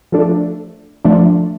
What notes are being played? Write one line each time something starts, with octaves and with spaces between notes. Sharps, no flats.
F3 A3 D4
F3 A3 D4